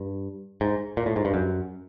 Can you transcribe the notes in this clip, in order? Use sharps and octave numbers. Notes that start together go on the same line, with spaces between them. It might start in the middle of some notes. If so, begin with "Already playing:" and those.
Already playing: G2
G#2
A#2
A2
G#2
G2
F#2